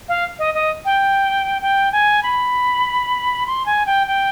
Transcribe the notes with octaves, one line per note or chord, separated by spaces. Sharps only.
F5
D#5
D#5
G5
G5
G#5
B5
C6
G#5
G5
G5